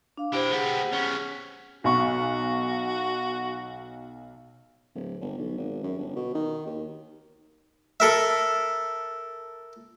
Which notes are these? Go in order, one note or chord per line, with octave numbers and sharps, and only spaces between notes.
D4 F5 D6
E4 G4 C5 G5
B3 G4 G#4 F#5
B3 C#4
B1 F#4 C#6
D1
G1
B1
G#1
F#2
G1
B2
D#3
D#2
A4 A#4 E5